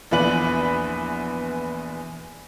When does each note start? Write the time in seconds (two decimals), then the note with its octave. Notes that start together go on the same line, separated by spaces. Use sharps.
0.11 A#1 E2 B3 B4 D5 F#7